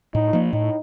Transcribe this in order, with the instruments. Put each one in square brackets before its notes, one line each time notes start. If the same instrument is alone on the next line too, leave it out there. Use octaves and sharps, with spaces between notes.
[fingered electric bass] A2 [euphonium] D#4
[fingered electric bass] F3 A#3
[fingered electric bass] A2 [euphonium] D#4